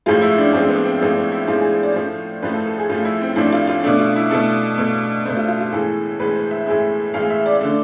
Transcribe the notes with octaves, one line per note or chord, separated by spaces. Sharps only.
A2 F3 G#3 F4
E4
D4
A2 F3 G#3 C4
B3
C4
A2 F3 G#3 B3
C4
E4
A2 F3 G#3 F4
G#4
C5
D5
A2 F3 A3 C5
A2 F3 A3 B4
A4
A4
G#4
A2 F3 A3 F4
E4
C4
A2 F3 A3 D4
F4
F4
B2 A3 D4
F4
E4
B2 A3 A4
B2 A3
B2 A3 C5
F4
F4
F4
A2 E3 G#3 A4
A2 E3 G#3 B4
C5
E5
A2 E3 G#3 E5
A2 E3 G#3 F5
E5
D5
D3 A3